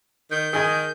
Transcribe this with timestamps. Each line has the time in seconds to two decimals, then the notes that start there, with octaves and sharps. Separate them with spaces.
0.31 D#3 G6
0.53 D#3 G#4 D#5 G#5